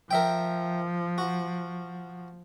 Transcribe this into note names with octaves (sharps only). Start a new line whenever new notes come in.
F3 A#4 E5 G5
F#4